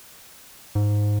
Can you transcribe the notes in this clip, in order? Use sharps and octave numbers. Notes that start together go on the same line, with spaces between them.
G#2